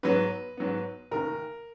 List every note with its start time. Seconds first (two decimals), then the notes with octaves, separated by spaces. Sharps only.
0.03 G#2 F#3 B3 B4
0.57 G#2 F#3 B3
1.11 F1 D#2 D#3 A#4